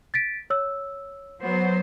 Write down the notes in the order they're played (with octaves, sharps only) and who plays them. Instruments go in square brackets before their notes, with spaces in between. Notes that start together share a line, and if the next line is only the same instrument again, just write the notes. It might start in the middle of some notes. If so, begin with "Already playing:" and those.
[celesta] A6 B6 D7
C#5 E6
[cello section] F#3 B3 C5